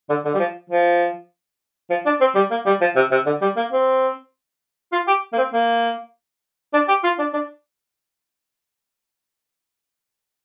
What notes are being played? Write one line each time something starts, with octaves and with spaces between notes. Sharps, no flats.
D3
D3
G3
F3
F3
F3
D4
C4
G3
A#3
G3
F3
C3
C3
D3
G3
A#3
C4
F4
G4
A#3
C4
A#3
D4
G4
F4
D4
D4